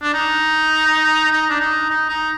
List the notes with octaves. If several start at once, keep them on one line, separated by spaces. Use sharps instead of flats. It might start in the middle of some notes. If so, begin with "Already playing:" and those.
D4
D#4
D#4
D4
D#4
D#4
D#4